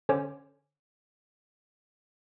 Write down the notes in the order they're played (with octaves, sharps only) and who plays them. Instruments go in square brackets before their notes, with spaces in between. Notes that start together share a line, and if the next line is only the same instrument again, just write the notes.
[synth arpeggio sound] D3 C#4 C5 C#5 D6